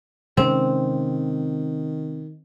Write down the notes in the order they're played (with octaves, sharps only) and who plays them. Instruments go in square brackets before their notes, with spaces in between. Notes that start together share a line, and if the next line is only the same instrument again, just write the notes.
[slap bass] C3 G#3 C#4 [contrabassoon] D#3 [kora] C4